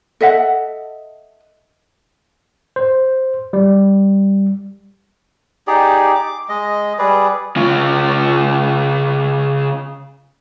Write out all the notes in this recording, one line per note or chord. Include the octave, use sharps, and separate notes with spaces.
A4 D#5 E5 F#5
C5
G3
D#4 G4 G#4 D5
D6
G#3 D#5
G3 G#4 B4 D5
C#3 F4